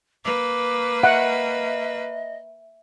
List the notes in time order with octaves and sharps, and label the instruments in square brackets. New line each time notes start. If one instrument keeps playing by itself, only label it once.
[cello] A#3 B4 [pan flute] D6
[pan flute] D#5 [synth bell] E5 [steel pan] F#5